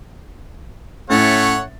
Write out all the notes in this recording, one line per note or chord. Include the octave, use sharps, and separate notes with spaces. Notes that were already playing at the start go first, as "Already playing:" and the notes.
A2 A3 C#4 C#5 F#5 A6